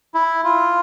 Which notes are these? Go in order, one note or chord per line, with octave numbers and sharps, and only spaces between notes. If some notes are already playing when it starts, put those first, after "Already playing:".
E4
F4